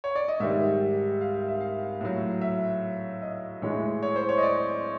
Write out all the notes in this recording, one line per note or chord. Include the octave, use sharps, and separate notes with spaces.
C#5
D5
D#5
G#2 D#3 G3 E5
F5
E5
E5
F5
A2 F#3
E5
D#5
A2 E3 G#3 C#5
C#5
C5
C#5
D#5
D5